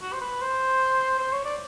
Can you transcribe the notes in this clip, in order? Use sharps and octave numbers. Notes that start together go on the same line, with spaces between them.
F#4
C5
B4
C5
C5
C#5
D5